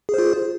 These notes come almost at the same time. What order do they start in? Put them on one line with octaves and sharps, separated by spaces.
G#4 C5 F4